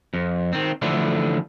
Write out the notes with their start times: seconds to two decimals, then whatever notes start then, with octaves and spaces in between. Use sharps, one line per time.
0.14 F2
0.53 D#3 C4
0.82 D3 E3 F3 A3 D4